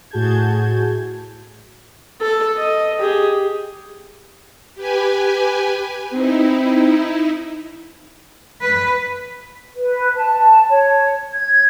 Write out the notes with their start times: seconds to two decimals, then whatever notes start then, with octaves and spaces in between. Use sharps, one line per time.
0.11 A2 F#4 G#4 A5 G6 G#6
2.21 A4
2.58 D#5
2.99 G4 G#4
4.75 G4 B4 G#5
6.13 C4 D#4 E4
8.61 B4
9.77 B4
10.16 A5
10.70 C#5
11.34 G#6